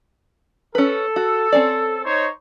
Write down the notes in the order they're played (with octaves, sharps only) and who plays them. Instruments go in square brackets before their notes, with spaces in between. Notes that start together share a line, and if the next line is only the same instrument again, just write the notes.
[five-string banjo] C#4 B4 [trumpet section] A4
[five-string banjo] F#4
C4 C#4 D5
[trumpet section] D#4 C5 C#5